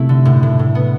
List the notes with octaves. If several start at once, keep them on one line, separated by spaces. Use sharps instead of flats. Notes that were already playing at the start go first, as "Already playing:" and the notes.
Already playing: C3 A3 E4
D3
A2
A2
A2
B3